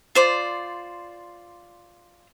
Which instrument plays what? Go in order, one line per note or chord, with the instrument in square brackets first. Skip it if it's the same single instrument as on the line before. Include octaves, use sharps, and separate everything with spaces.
[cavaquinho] F4 C5 D5